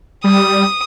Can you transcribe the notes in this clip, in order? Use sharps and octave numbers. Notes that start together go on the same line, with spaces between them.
G3 D#6